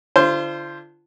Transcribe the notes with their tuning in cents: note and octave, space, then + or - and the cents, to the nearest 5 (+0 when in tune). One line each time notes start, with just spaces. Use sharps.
D3 +0 F4 -35 C5 +0